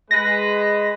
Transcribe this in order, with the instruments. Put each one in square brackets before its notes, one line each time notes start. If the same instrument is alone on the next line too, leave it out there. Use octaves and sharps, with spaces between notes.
[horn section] G#3 B4 [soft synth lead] A#6